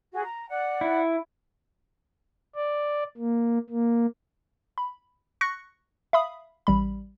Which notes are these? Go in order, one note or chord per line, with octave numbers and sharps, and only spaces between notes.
F#4 G#4
A#5
D5 F#5
E4
D5
A#3
A#3
B5
C#6 F#6 A#6 C#7
E5 F5 B5 D#6
A1 G3 B5